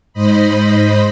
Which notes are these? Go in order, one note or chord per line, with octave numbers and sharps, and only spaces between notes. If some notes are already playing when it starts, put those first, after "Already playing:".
G#2 C5 D#5 B5